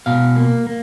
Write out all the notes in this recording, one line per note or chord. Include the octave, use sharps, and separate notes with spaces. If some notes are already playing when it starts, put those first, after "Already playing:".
B2 F5
A#3
A#3